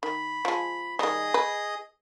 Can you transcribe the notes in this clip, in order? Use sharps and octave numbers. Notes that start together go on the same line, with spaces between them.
D#3 B5
F3 G#3
D#3 G3 G#4 D#5 D#6
B4